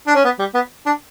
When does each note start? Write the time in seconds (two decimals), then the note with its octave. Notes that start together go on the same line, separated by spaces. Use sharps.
0.07 D4
0.15 C#4
0.25 B3
0.39 G3
0.55 B3
0.86 D4